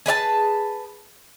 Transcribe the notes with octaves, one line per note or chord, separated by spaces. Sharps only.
G#4 B4 D#5 A5